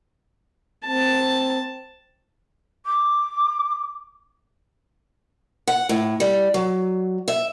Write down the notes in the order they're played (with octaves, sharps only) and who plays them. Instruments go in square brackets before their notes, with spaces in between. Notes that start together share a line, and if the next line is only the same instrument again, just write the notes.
[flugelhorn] C4 [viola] A5
[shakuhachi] D6
[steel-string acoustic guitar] F#5
A2
G3
F#3
E5